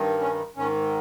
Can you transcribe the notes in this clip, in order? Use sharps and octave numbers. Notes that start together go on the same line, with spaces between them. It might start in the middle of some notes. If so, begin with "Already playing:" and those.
Already playing: G2 D#3
C#4
G#2 D#3 C#4